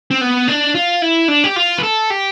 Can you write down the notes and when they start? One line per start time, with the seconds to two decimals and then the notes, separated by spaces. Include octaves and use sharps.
0.11 C4
0.21 B3
0.48 D4
0.75 F4
1.02 E4
1.28 D4
1.44 G4
1.56 F4
1.78 B4
1.83 A4
2.10 G4